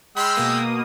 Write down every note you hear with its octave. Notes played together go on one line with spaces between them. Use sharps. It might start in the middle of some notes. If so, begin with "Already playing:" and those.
G#3 G5 B5 C6 E6 F6
B2 A#3 D#6